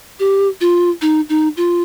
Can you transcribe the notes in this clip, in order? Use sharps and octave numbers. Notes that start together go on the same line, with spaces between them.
G4
F4
D#4
D#4
F4